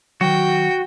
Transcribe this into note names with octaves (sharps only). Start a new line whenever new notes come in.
D#3 F#3 F#4 G5